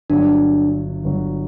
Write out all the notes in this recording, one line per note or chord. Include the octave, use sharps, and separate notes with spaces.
G1 G2 F#3 D4
G1 G2 F#3